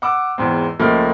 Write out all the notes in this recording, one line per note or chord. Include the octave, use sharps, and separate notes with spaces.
F#5 D6 E6
E2 G#2 C4
C#2 F3 A3 A#3 D#4 A#4